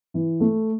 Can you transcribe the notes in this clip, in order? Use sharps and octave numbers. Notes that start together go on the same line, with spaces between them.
E3
A3